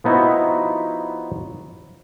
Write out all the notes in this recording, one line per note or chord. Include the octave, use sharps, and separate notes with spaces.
F3 B3 D#4 E4 F#4